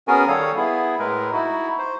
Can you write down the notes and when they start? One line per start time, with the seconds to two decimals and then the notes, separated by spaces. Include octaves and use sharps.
0.08 B3 C#4 F#4 G#4 A#4 G#5
0.28 D#3 G3 A4 C#5 F5 D#6
0.56 B3 E4 G#4
0.99 A2 G#3 A#4 B4
1.33 D#4 E4 F#4
1.79 C5